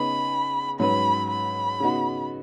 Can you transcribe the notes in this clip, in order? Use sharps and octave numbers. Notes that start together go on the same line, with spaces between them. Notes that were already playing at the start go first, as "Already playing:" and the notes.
Already playing: C#3 B3 D#4 G#4 B4 B5
G#2 F#3 C#4 B4 B5
B5
C#3 B3 D#4 F#4